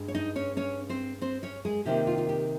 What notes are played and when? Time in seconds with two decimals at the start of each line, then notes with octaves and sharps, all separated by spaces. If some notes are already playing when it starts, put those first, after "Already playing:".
Already playing: G2 G#3
0.08 C#5
0.15 D#4 D#5
0.36 C#4 C#5
0.57 C#4 C#5
0.89 C4 C5
1.21 C4 C5
1.43 C#4 C#5
1.65 G#3 G#4
1.85 C3 D#3 A#3 F4 G4
2.07 F4
2.18 F4
2.29 G4